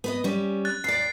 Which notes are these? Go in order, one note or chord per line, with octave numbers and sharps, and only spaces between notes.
B3 B4 D#5
G3 C#4
F#6 A6
D#2 D5 C7